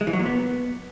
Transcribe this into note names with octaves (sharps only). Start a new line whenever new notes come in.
G#3
E3
F#3
A#2
B3